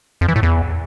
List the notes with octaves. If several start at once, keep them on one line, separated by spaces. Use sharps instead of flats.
F2
E3
A2
E2